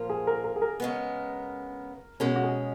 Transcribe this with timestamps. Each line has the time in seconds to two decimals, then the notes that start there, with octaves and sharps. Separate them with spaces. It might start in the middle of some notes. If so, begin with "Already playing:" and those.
Already playing: A#2 F3 A#3 F4
0.10 G#4
0.27 A#4
0.44 A#4
0.56 G#4
0.62 A#4
0.80 C#3 G#3 B3
2.20 B2 G#3 C#4 A#4
2.36 F#4
2.44 G#4